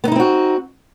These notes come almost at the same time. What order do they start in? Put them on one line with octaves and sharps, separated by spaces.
B3 D#4 E4 C4 F#4